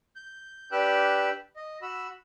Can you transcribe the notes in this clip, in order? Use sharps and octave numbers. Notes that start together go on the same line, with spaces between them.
G6
D4 G4 B4 G5 E6 F#6
D#5
F#4 B5 E6